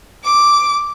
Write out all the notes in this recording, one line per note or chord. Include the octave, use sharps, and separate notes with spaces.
D6